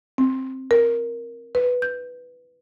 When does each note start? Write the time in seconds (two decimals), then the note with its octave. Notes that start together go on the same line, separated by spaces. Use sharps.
0.18 C4
0.71 A#4
1.55 B4
1.82 G6